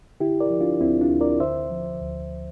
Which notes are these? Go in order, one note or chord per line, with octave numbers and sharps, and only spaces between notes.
D3 E4 G4
A#4 D5
F3
D4 F4
D2 C4 E4
D4 F4
D2
A#4 D5
D3 C5 E5
F3
D2